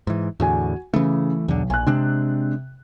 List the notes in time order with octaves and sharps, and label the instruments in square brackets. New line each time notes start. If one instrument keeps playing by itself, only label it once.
[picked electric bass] G#2 E3
[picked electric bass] E2 A2 D3 [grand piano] F#4 G#5
[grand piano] C#3 [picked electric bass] E3 A3
[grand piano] B1 [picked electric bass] E2 D3
[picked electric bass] A#1 [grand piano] G#5 F#6
[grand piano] C3 [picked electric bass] G#3 C4 D4